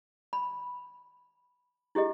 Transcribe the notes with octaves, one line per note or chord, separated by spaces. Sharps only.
B5
E4 G4 G#4 D#5